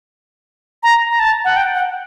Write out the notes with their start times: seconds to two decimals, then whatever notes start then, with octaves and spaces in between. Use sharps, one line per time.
0.83 A#5
1.10 A#5
1.20 A5
1.45 F#5
1.56 G5
1.74 F#5